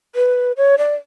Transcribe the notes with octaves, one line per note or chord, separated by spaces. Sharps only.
B4
C#5
D5